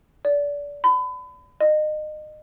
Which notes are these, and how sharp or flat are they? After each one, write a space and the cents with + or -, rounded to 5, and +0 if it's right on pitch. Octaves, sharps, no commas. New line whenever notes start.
D5 -25
B5 +35
D#5 -30